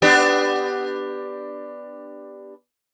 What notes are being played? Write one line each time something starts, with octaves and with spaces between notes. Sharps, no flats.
B3 D4 G4